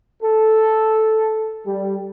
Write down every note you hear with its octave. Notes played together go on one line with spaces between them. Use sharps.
A4
G3